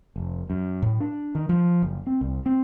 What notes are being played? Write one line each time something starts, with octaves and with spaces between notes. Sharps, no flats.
F1
F#2
A2
D4
D#3
F3
F#1
C4
C2
C4